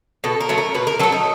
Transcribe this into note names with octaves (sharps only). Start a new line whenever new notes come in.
B2 A4
A#4
F#3 A3
A#4
B2 B4
A#4
F#3 A3 A4
D#4